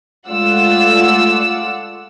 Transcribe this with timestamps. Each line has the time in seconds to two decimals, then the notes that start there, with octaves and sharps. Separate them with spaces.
0.28 G#3 A3 F4 D5 F#5 E6